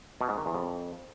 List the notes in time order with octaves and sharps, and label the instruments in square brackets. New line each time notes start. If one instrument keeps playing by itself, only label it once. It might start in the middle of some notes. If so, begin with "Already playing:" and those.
[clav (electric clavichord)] B2
G#2
D#3
E2
F2